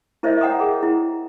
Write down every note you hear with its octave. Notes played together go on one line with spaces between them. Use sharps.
E4 A#4 C5 C#5 D#5 E5
C#5 F#5 G5 A#5 D#6
G#4 A#4
E4